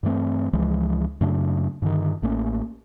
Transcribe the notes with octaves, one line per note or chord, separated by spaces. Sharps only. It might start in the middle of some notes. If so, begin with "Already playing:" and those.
G2 E3 A3 C4
C#2 E3 F3 G#3
F#2 C#3 A3 D4
G2 D3 D#3
A1 A3 A#3 C#4